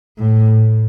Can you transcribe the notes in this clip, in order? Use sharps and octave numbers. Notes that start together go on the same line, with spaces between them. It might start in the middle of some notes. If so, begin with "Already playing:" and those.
A2